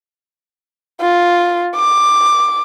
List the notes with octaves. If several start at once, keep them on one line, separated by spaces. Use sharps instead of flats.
F4
D6